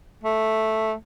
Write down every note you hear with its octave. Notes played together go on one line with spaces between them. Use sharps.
A3